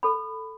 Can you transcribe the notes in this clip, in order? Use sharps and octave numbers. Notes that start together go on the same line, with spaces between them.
A4 B5